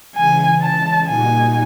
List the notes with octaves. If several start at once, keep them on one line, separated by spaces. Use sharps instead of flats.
C#3 E3 G#3 G#5
A5
A#2 G3 A#3 D#4 F#4 G#5